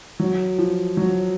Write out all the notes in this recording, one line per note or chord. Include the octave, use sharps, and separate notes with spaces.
F#3
F3
F#3